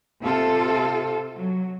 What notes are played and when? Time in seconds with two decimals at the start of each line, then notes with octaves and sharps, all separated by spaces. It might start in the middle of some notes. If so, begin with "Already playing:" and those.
0.22 C3 F4 A4
1.36 F#3